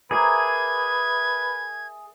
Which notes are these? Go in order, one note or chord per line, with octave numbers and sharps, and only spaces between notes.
G#4 A#4 B4 D5 E5 G#6